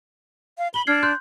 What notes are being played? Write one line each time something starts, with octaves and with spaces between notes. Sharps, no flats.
F5
B5 F#7 G7
D4 F6 G#6 C7
C6 F#6 G6